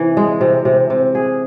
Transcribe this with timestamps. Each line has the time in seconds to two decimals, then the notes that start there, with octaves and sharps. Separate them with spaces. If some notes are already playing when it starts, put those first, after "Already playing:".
Already playing: C3 E3
0.17 G#3
0.41 C3
0.65 C3
0.90 C3
1.15 G#4